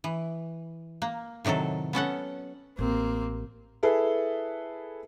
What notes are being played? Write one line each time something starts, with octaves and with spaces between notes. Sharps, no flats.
E3
A#3
A2 C3 D#3 F#3 A4
B3 C#4 A4 F#5
A1 A#3 C4
E4 G#4 A4 B4